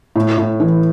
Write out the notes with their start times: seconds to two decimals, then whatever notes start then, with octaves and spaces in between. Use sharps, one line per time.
0.16 A2
0.38 A2
0.60 E3